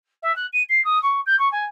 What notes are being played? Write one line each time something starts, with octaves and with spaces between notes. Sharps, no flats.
E5
F#6
D#7
C7
D#6
C#6
G6
C#6
G#5